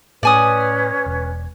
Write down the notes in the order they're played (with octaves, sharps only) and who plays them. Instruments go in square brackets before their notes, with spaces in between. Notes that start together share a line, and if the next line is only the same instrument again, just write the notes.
[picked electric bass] A2 [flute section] C#4 B4 [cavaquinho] D5 G#5 D#6
[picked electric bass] E1